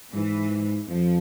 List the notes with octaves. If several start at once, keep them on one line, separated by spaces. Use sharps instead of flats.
G#2 E3
F2 F3